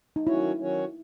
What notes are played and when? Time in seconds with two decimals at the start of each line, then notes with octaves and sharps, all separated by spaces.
0.16 D#4
0.27 D#3 F#3 C#4 E4 F#4 C#5
0.59 D#3 F#3 C#4 F#4 C#5